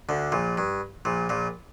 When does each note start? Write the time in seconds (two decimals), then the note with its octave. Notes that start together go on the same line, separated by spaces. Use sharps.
0.09 D2 D3
0.32 A#1 A#2
0.57 G2
1.05 A#1 A#2
1.29 A#1 A#2